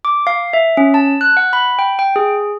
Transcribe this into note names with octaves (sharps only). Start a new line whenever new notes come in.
D6
F5
E5
C#4
A5
F#6
F#5
B5
G5
G5
G#4